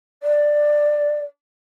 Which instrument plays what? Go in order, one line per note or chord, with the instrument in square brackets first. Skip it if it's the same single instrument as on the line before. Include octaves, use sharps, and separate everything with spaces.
[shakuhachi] D5